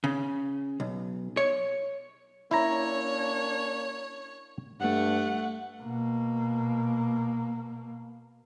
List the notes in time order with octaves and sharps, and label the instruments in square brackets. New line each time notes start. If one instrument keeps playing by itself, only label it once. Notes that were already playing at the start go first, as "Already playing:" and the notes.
[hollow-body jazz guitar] C#3
B1
C#5
[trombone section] A#3 C#4 D4 [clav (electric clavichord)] E4 A#5 [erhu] C#5
[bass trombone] G2 [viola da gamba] A3 [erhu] F#5
[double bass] B2 A#3